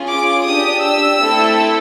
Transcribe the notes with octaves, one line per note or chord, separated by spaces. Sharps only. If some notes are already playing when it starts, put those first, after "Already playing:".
Already playing: C#4 F4 G#4
D6
D4 G4 D#6
E6
A3 C4 E4 A4